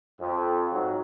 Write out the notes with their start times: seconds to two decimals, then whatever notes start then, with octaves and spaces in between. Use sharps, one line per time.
0.20 F2
0.72 G#2 F#3